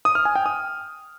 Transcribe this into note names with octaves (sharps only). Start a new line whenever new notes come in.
D#6
F6
G#5
G5
D#6